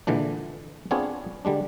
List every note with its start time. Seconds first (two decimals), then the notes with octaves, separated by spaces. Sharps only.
0.07 A#2 D3 E3 G#3 D4
0.91 B3 C4 D4 F4 G#4 C#5
1.45 D3 G3 G#3 D4